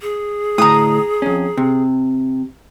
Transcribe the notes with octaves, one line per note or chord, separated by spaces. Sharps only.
G#4
D2 A2 A#5 D#6
F2 C#4
C3